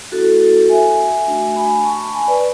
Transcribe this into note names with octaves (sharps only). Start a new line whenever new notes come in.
A3 C#4 E4 F#4 A4
E5 G#5
A3 D4 F#4
G#5 B5
A5 C#6
G#5 B5
B4 D5